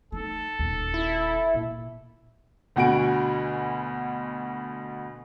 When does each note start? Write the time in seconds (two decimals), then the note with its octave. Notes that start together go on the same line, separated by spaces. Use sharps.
0.12 A3 D#4 A4
0.59 D#1 D#2
0.94 E4
1.54 A#2 A#3
2.76 D2 B2 F#4 G#5 D7